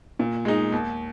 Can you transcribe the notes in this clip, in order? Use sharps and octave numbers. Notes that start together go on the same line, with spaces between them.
A#2
G#3 D#4
D#2